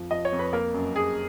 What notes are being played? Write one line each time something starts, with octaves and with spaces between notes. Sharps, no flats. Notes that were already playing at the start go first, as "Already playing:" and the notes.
Already playing: F2 F3
F3 D#5
C#5
F2
B4
A#3 A#4
F#2
A#3 G#4